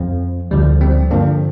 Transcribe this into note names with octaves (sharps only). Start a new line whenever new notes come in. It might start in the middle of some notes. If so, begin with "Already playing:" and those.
Already playing: F2 F3
D2 D3 F3 G3
G3 C4
G2 D3 F3 A#3 D4